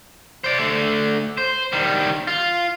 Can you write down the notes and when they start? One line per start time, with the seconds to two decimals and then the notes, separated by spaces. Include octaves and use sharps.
0.44 C5 D5
0.58 D3 A3
1.38 C5
1.73 D#3 G3
2.27 F4